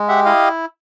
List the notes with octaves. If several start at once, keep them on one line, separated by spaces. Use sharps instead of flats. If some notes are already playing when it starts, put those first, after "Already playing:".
Already playing: G#3
G4 E5 F#5
E4 D#5 F5